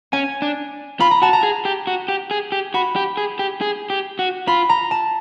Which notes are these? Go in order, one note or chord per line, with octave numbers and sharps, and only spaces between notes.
C#4 G#5
D4
F4 B5
A#5
F#4 A5
A#5
G#4
G4
F#4
G4
G#4
G4
F#4 B5
G4
G#4
G4
G#4
G4
F#4
F4 B5
A#5
A5